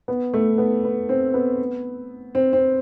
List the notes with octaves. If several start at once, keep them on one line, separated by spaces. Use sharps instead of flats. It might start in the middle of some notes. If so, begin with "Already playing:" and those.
B3
A3
B3
B3
C4
B3
C4
C4